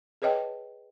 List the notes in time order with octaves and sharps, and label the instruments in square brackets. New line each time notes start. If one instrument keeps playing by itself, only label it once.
[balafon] G#4 B4 C#5 D#5 G5 A5